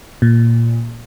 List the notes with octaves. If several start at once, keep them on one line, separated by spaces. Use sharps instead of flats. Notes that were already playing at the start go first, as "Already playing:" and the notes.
A#2